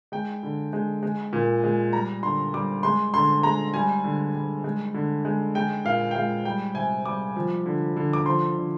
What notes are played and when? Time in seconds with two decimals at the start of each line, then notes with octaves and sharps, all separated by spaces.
0.12 G#3 G5
0.43 D3
0.73 G#3
1.03 G#3
1.33 A#2
1.64 G#3
1.93 G3 A#5
2.23 D3 C6
2.53 G3 D6
2.83 G#3 C6
3.14 D3 C6
3.43 G#3 A#5
3.74 G3 G#5
4.04 D3
4.35 G3
4.64 G#3
4.94 D3
5.25 G#3
5.55 G#3 G5
5.85 A#2 F5
6.11 G5
6.15 G#3 F5
6.45 G3 G5
6.75 C3 G#5
7.06 G3 D6
7.36 F3
7.66 D3
7.97 D3
8.13 D6
8.25 F3 C6
8.56 D3